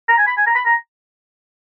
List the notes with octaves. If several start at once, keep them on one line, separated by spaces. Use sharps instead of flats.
A#5
G#5
B5
G#5
A#5
B5
A#5